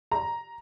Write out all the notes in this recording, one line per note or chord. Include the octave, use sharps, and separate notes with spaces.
A#5